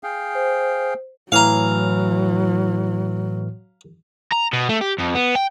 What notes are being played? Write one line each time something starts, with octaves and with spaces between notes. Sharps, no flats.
G#4 F5 G5
C5
A2 E3 F#3 F5 A#5 F6
A#5
B2
A3
G4
F2
B3
G5